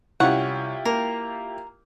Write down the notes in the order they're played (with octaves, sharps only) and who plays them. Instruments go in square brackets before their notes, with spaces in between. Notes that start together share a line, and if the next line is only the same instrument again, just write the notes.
[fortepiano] C2 C#4 C#6 [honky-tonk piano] E4 F4 G4 [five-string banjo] F#5
[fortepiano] A#3 [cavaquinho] A#4